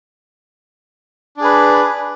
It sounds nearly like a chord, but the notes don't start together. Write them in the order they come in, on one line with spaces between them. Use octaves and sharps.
D4 G#4 B4